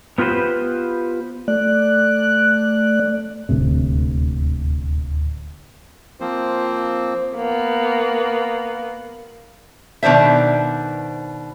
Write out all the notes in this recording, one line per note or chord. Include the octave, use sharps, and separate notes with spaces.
B3 F4 G4 B4 C5
A3 D5 F#6
D#1 D2 A2 C3
F3 A#3 C4 C5
A#3 B3
B2 D#3 D4 C5 E5